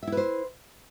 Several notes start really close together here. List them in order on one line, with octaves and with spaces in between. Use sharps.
E5 E4 B4 C5